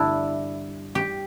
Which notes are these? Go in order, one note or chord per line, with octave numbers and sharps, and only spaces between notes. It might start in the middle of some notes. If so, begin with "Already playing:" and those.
Already playing: G2 D3 D4 E4
G4